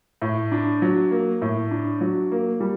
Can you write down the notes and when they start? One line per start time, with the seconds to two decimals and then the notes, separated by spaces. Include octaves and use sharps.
0.22 A2
0.52 D4
0.82 F#3
1.11 A#3
1.42 A2
1.71 D4
2.01 F#3
2.32 A#3
2.60 G3